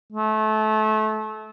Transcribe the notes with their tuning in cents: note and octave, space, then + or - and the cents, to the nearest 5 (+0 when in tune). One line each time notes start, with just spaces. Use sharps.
A3 -25